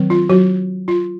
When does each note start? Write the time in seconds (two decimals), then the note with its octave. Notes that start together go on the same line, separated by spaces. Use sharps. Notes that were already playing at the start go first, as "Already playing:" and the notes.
Already playing: D#3 F#3 C4
0.10 F4
0.30 F#3 F#4
0.88 F4